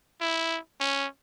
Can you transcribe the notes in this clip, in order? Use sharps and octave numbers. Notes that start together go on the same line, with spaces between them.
E4
C#4